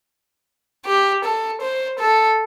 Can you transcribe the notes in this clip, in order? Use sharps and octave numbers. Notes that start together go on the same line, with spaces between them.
G4
A4
C5
A4